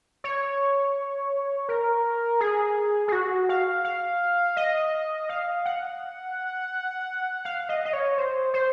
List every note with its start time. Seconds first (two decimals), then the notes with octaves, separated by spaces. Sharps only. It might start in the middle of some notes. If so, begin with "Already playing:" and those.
0.24 C#5
1.69 A#4
2.40 G#4
3.08 G#4
3.12 F#4
3.49 F5
3.84 F5
4.57 D#5
5.29 F5
5.66 F#5
7.45 F5
7.69 D#5
7.85 D#5
7.93 C#5
8.18 C5
8.54 C5